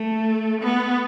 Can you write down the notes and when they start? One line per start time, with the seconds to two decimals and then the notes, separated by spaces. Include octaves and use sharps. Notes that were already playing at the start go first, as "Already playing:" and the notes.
Already playing: A3
0.62 B3